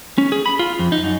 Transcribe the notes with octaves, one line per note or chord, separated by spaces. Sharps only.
C#4
G#4
B5
F4
F2
D#4
F#2